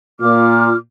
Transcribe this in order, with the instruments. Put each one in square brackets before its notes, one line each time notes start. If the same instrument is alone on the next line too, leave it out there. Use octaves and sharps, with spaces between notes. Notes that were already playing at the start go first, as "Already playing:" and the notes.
[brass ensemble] A#2 [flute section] F4 D6 F6